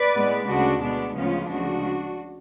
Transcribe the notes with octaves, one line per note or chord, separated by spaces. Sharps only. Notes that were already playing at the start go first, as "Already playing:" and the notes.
Already playing: B4 D5
A2 G#3 B3
D2 C#3 G#3 D4 F#4
B2 G#3 B3 D4
D2 C#3 F3 G#3 B3 C#4 F4
D2 C#3 F3 G#3 D4 F#4